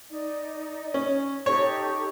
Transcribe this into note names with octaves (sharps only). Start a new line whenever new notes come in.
D#4 D5
C#4
D#4 G4 A4 C#5